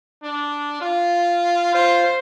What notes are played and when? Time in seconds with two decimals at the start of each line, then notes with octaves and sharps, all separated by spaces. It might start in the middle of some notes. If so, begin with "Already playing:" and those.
0.23 D4
0.81 F4
1.74 F4 C5